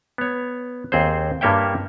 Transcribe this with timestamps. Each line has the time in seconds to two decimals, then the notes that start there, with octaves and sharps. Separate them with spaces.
0.18 B3 C#5
0.92 D#2 C4 G#4 C5
1.41 G2 G3 A#3 C#5 E5 G5